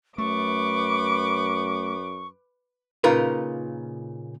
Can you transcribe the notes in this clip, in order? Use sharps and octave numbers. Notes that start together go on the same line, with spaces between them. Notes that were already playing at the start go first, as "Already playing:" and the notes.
F#2 A3 B4 C#6 D6
A#2 C#3 D#4 F4 A#4 B4